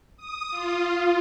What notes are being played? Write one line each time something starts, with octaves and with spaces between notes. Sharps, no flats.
D#6
F4